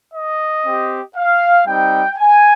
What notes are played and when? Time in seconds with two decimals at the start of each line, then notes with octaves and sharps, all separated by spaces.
0.14 D#5
0.64 C4 G4
1.16 F5
1.67 G3 C4 D#4 G5
2.18 G#5